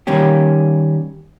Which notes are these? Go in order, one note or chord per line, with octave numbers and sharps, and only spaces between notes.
D#3 G3 A#3 C#4 G4